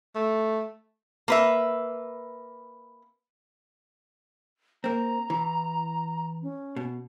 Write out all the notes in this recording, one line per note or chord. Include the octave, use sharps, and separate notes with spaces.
A3
A#3 B4 E5
A#3 C4 A#5
E3
C#4
B2